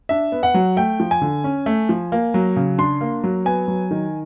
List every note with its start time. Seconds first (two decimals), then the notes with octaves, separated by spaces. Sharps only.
0.09 D4 E5
0.32 B3
0.43 F#5
0.54 F#3
0.77 A3 G5
1.00 F3
1.11 G#5
1.21 D3
1.44 C#4
1.66 A3
1.89 F3
2.12 A#3
2.34 F#3
2.56 C#3
2.78 D4 C6
3.01 A#3
3.24 F#3
3.45 B3 G#5
3.68 F#3
3.91 D#3